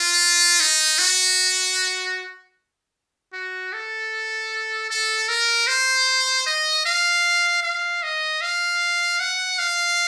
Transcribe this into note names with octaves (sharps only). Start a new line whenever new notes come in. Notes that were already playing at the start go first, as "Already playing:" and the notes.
Already playing: F4
D#4
F#4
F#4
A4
A4
A#4
C5
D#5
F5
F5
D#5
F5
F#5
F5